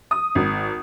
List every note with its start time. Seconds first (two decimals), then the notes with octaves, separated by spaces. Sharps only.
0.11 D#6
0.35 G#1